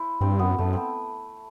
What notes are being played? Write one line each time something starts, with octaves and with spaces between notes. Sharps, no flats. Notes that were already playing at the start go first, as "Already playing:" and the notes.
Already playing: E4 C5
G2 C4
F#2 B3
F#2 A3
B3 C4